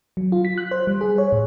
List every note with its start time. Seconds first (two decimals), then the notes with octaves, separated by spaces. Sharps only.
0.17 F#3
0.32 F4
0.45 B6
0.58 F#6
0.71 C5
0.87 G3
1.01 G#4
1.18 C#5
1.32 A2